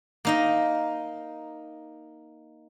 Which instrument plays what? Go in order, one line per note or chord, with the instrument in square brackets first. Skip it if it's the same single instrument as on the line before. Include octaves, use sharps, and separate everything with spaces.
[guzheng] A#3 D#4 D#5